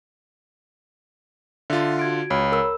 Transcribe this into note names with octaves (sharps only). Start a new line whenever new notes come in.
D3 F4 E5
F#4 G#6 D7
C#2 C#5 B5
A#4 E6